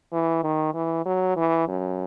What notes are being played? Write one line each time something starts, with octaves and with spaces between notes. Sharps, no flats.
E3
D#3
E3
F#3
E3
F#2